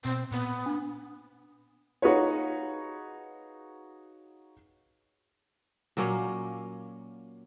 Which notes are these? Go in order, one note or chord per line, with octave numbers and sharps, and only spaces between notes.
B2 C4
A#2 B3
D4
D#4 F4 F#4 G#4 B4 C#5
A#2 F#3 A#3 C#4